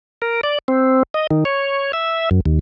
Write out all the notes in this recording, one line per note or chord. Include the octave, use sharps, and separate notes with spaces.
A#4
D5
C4
D#5
D#3
C#5
E5
F#2
D#2